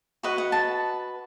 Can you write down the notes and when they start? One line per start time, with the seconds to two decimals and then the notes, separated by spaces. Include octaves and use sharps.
0.23 F#4 B4 D#5 F#5
0.38 F#5
0.52 A5